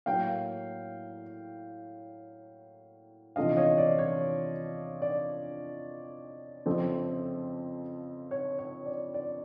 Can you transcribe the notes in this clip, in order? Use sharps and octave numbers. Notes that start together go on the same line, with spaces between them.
A2 F#3 A#3 F5 G5
E2 C3 F3 A3 D4 D#5 F5
C#5 D#5
D5
C#5
D5
F2 C#3 F3 A3 C4
C#5
C#5
D5
D5